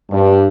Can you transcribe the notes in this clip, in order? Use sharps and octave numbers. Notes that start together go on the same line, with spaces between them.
G2